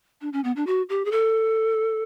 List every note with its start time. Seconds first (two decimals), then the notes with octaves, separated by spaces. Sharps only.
0.21 D4
0.33 C#4
0.44 B3
0.56 D4
0.67 F#4
0.89 G4
1.05 G#4
1.11 A4